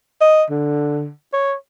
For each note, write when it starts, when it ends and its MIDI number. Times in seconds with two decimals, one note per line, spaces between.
0.21 0.43 75
0.50 1.10 50
1.33 1.55 73